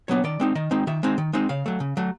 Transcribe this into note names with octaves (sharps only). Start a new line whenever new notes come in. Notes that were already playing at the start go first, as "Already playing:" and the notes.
F#3 B3 D4 C#5
D#3 D5
G#3 C4 D#4
D#3 D#5
G#3 C4 D#4
D#3 E5
G#3 C4 D#4
D#3
G#3 C4 D#4
C#3 F5
F#3 A3
C#3
F#3 A3